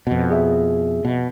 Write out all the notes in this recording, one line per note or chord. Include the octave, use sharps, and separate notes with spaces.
F2 B2
G#4 E5
B2